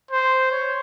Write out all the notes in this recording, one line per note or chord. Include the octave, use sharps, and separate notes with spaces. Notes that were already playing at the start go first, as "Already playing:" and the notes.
C5
C#5